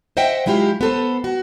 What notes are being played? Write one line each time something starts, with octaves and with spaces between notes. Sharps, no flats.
C5 D#5 E5 F#5 G5
F#3 G#3 E4 F4 G4
B3 A4 C5
F#4